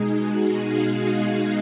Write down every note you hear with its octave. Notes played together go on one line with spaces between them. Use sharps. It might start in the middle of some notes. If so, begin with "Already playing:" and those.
Already playing: B2 G#3 D#4 G#4
F#4
F5
D#5